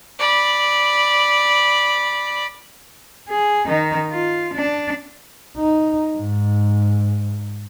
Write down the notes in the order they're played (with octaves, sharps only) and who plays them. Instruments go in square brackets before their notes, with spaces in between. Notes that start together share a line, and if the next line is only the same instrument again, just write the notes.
[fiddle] D5 B5
[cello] G#4
D#3 D#4
F4
D4
[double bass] D#4
G#2